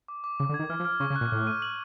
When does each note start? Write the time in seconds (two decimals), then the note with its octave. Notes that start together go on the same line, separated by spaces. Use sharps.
0.08 D6
0.24 D6
0.40 C#3 D6
0.49 D3
0.54 G#6
0.59 D#3
0.70 E3 F6
0.80 F3
0.85 F6
1.00 C#3 C#6
1.10 C#3
1.16 F#6
1.21 A#2
1.32 A2 F#6
1.47 D#7
1.62 F#7